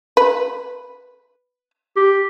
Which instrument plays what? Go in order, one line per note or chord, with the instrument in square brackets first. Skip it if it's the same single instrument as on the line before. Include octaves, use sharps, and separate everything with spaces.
[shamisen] B4
[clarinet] G4